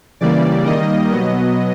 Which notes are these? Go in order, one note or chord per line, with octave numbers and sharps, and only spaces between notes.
C#3 E3 G3 A#3 D5
D#3 G3 A#3 D#5
B2 F#3 B3 D#5